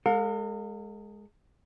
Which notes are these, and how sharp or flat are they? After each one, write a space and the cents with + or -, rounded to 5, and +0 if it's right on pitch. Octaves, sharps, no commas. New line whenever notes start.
G#3 +0 A#4 -45 F5 +35